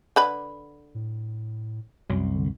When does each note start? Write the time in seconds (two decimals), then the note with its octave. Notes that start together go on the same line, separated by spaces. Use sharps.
0.16 D3 B4 B5
0.95 A2
2.10 C2 F#2
2.34 D3